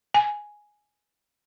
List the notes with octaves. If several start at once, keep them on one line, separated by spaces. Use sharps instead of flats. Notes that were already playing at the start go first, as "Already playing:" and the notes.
G#5